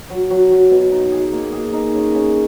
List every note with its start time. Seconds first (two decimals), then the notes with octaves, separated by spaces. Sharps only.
0.10 F#3
0.30 F#3
0.51 F#3
0.71 B2
0.91 D#4
1.12 G#4
1.32 A#3
1.52 G#4
1.73 D#4
1.94 C#3
2.14 C#3